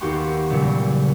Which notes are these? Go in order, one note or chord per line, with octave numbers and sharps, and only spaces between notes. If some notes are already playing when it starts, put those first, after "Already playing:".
D#2 B3 F#4 G4 G5 C6
E2 A#2 C#3 F#3 G3 B3